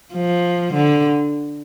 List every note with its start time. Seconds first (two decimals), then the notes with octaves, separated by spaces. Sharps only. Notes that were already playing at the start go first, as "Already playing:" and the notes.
0.14 F3
0.74 D3